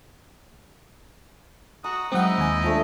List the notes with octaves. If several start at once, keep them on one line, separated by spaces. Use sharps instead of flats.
F#4 A#5 D#6
F#3 G#3 C4 D#4 E4 D#5 F#5
D#2 G#5
F3 A3 D4